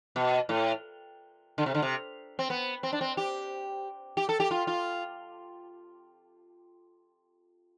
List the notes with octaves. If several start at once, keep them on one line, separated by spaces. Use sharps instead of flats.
B2
A2
D3
C3
D3
C3
C4
B3
C4
D4
C4
G4
G4
A4
G4
F4
F4